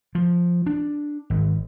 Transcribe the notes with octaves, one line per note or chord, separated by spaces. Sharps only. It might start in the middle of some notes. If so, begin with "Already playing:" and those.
F3
D4
G#1